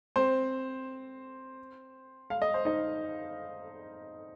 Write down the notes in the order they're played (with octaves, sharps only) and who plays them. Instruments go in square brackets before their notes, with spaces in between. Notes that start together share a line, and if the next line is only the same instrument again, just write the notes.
[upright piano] C4 C5
F5
D#5
C5
D#4 D#5